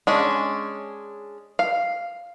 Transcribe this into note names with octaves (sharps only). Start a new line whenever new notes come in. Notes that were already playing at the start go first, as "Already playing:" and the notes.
G#3 C#4 D4
F5